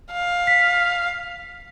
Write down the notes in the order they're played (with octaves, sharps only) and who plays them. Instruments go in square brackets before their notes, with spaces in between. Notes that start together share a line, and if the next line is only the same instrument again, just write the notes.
[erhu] F5
[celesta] B6